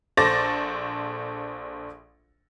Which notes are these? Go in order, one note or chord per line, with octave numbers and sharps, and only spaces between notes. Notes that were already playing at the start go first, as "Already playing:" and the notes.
A#1 A4 C5 D6 A6 A#6